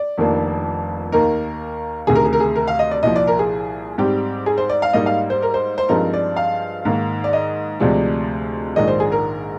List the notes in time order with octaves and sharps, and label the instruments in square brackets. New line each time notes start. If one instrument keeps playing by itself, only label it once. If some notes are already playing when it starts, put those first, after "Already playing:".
Already playing: [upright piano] D5
F1 F2 D#3 A#3 D4
D#2 D#3 A#3 D#4 A#4
D2 C3 D#3 G#4
A#4
G#4
A#4
G#4
A#4
F5
D#5
D5
C2 A#2 F3 D#5
D5
A#4
G#4
G#2 G3 C4 G4
G#4
C5
D5
F5
G#2 G3 A#3 D#4 D#5
F5
C5
A#4
C5
C5
G2 F3 G#3 C4 D#4 A#4
D5
F5
G#2 D#3 A#3
D5
D#5
D2 C3 F3 G#3 D4
A#1 G#2 D#3 G#3 D4 D#5
C5
G#4
A#4